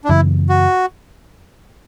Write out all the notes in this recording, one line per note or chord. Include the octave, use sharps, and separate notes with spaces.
D4
F#2 C#3 E3 B3 E4
F#4